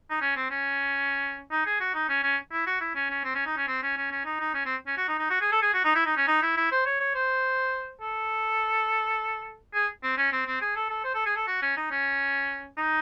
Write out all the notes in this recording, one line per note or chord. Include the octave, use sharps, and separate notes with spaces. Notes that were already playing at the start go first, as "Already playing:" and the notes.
D#4
C#4
C4
C#4
D#4
G#4
F#4
D#4
C#4
C#4
E4
F#4
E4
C#4
C#4
C4
C#4
D#4
C#4
C4
C#4
C#4
C#4
D#4
D#4
C#4
C4
C#4
F#4
D#4
D#4
F#4
G#4
A4
G#4
F#4
D#4
E4
D#4
C#4
D#4
E4
E4
C5
C#5
C#5
C5
A4
G#4
C4
C#4
C4
C4
G#4
A4
A4
C5
A4
G#4
A4
F#4
C#4
D#4
C#4
D#4